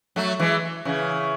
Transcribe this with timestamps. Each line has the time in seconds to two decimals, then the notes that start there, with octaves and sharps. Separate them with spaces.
0.16 F#3 A3
0.39 E3 G#3
0.85 C#3 E3